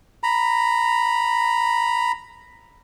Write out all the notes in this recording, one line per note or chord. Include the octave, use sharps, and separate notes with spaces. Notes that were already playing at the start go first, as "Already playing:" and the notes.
A#5 B5